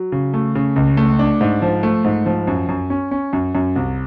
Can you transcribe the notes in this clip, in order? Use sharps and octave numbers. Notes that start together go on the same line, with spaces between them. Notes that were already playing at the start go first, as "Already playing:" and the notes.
Already playing: F#3
C#3
A3
C#3
C#2
A3
D4
G#2
F3
A3
G#2
F3
F#2
F#2
C#4
C#4
F#2
F#2
C2